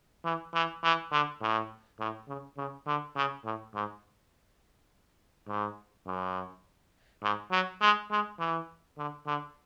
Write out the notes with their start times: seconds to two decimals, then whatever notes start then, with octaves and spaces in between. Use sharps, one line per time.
0.25 E3
0.54 E3
0.84 E3
1.12 D3
1.42 A2
2.00 A2
2.28 C#3
2.57 C#3
2.87 D3
3.16 C#3
3.44 A2
3.74 G#2
5.48 G#2
6.06 F#2
7.23 G#2
7.51 F#3
7.81 G#3
8.11 G#3
8.40 E3
8.98 D3
9.27 D3